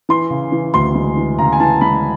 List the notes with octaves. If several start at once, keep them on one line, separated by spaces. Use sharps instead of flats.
E3 C6
C#3
E3
D2 C6
G#3
E3
C#3 A#5
G#5
E3 A5
G#3 B5